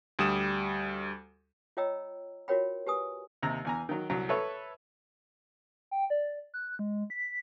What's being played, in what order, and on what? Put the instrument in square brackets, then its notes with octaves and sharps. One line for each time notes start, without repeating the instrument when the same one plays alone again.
[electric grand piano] D2 G3 D#6 E7
[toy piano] F4 C#5 D#5 G5 A#5 E6
F4 F#4 A#4 C#5 G5 B5
G4 B4 G#5 D#6
[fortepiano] D#2 C3 A#5
E2 G#5 A#5
D#3 F#3
C2 F#3
A4 B4 C#5 E5
[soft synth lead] G5
D5
F#6
G#3
B6